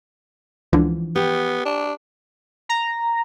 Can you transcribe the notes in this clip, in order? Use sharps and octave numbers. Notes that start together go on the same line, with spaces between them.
C#2 D3 E3 F3
B3 G4
D4
A#5